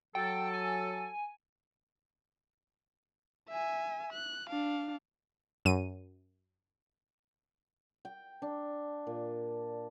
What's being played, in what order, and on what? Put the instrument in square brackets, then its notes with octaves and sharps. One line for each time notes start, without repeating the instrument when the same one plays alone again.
[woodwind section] F#3 A4 [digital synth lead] G5
[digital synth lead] G#5
[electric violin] E5 G#5
F#6
D4 F5
[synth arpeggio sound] F#2 D#7
[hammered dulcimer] G5
D4
A#2